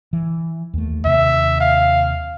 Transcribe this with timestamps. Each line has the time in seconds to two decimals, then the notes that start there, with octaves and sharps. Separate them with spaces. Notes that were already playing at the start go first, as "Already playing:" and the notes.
0.13 E3
0.74 D#2 A3
1.05 D#2 C3 E5
1.60 F5